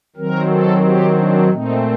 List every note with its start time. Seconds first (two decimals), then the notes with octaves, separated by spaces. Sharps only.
0.16 D#3 F#3 C4 A#4
0.50 A4
0.83 G4
1.17 D4
1.50 A#2 A3 C4 D#4